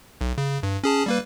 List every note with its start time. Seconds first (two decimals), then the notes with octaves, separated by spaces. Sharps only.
0.21 B1
0.38 C#3
0.63 G2
0.84 C#4 G#4 A5
1.06 G3 A#3 B4